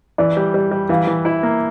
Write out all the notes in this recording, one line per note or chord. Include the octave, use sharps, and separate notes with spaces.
E3 D5
G3
G3
G3
E3 F5
E3
E4
A#3